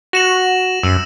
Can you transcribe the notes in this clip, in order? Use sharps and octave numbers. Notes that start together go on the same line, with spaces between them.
F#4 A#6 E7 F#7
F#2 E6